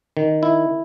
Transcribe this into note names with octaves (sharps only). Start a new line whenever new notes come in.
D#3
E4